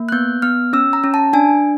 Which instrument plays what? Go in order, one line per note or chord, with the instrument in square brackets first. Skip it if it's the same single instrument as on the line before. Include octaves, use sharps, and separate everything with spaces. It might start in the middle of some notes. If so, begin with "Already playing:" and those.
Already playing: [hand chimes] A#3
F#6
B3 G6
B3 F6
C#4 E6
A#5
C#4
A5
D4 G#5